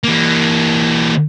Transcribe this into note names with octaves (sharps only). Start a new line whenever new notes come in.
E3 A#3